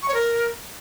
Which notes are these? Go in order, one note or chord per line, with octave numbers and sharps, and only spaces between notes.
C#6
C#5
A#4